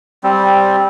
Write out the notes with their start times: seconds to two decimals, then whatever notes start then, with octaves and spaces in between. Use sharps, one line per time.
0.24 G3 C4